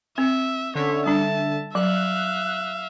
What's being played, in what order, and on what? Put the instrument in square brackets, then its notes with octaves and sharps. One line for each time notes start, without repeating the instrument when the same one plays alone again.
[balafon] C4 [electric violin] E5
[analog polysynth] D3 E5 [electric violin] C#4 C#5
[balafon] G3 D4 [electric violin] A5
[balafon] F#3 [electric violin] E5 F5 [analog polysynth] F#6